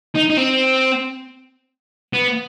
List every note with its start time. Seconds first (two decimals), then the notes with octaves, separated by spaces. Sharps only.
0.15 D#4
0.30 D#4
0.37 C4
2.13 B3